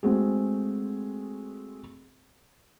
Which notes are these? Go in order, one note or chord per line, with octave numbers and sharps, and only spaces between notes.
G#3 A3 C4 F#4 G#4